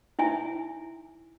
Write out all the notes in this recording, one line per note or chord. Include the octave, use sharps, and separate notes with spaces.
D#4 E4 E5 G#5